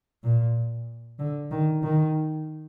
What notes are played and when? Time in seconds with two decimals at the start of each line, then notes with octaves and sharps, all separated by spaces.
0.24 A#2
1.19 D3
1.51 D#3
1.83 D#3